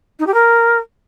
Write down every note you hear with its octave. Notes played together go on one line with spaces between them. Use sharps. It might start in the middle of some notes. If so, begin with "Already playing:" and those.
D#4
G4
A#4